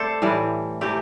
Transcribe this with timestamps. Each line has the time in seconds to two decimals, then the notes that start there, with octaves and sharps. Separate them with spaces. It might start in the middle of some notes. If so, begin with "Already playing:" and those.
Already playing: C3 A3 A4 C5 D5
0.22 A2 E3 G3
0.81 C3 E3 A3 G4